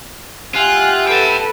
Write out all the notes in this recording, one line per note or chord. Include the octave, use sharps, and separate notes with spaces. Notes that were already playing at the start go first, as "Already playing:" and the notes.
F4 G4 E5 F#5 G#5 F#6
A4 B4 G5 A5